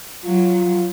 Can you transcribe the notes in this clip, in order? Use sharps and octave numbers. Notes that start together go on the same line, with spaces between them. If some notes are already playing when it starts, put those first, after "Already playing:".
F#3 F4